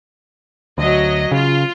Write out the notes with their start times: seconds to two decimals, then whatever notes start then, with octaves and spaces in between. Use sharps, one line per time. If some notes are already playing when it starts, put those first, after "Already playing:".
0.78 D2 F#3 D#5
1.31 C#3 F4